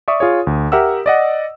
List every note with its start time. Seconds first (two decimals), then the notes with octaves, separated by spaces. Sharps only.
0.08 D5 E5 C#6 D#6
0.20 F4 G#4 C#5
0.47 D2
0.72 G4 A#4 E5 F#5 E6
1.06 D5 D#5 F#5